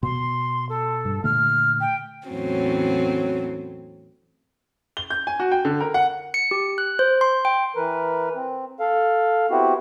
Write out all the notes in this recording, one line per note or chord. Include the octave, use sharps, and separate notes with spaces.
B2 C6
A4
G2
A#2 D3 A3 F6
G5
E2 A2 F#3 C4 C#4
G7
G6
G#5
F#4
G5
D3
A#4
F#5
C#7
G4
F#6
C5
C6
G5
E3 A#4 B4
C4
A4 F5
B3 C4 E4 F#4 G4